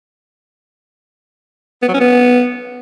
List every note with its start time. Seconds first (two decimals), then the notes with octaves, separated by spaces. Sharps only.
1.82 B3
1.88 F#3
1.94 C#4
2.00 B3